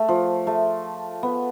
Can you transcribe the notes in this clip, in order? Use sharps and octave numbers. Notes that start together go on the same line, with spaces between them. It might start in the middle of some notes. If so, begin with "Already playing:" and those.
Already playing: A3
F3
A3
B3